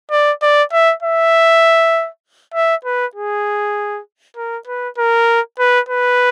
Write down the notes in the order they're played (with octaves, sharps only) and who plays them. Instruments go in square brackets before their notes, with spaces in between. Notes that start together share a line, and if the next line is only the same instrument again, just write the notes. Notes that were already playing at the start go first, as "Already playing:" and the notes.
[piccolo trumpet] D5
D5
E5
E5
E5
B4
G#4
A#4
B4
A#4
B4
B4